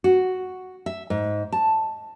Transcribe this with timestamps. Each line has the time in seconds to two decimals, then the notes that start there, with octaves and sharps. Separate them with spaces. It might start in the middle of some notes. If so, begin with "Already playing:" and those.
0.04 F#4
0.86 E5
1.10 G#2
1.52 A5